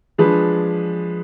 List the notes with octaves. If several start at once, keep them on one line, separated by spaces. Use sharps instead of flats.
F3 G#3 D4 G#4 B4